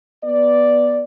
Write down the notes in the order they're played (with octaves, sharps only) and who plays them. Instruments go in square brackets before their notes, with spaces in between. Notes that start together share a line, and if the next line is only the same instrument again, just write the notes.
[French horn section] B3 D5